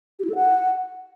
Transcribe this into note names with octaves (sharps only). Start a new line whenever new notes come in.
G4
E4
A4
F#5